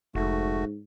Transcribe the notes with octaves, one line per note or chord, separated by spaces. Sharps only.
F1 G#2 A3 F#4